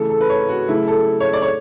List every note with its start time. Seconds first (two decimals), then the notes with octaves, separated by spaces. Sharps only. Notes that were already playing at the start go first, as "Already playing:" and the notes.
Already playing: C#3 E3 A3 A4
0.10 A4
0.21 B4
0.29 C#5
0.49 F#4
0.68 C#3 F#3 A3 E4
0.88 A4
1.20 C#5
1.33 D5
1.42 C#5